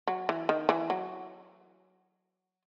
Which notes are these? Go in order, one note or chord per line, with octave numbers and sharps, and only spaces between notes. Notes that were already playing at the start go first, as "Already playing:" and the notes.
F#3
E3
D#3
E3
F#3